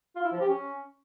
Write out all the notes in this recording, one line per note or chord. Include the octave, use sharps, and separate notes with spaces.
F4
E4
F3
G4
C#4